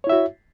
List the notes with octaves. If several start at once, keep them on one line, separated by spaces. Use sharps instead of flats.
E4 F#4 C#5 E5